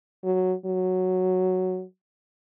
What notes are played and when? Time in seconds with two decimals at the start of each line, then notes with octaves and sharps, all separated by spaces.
0.24 F#3
0.66 F#3